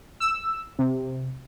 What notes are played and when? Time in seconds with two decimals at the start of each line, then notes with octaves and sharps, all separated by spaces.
0.20 E6
0.79 C3